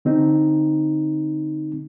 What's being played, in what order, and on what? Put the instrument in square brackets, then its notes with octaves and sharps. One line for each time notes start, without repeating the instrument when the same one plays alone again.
[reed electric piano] D3 C4 D#4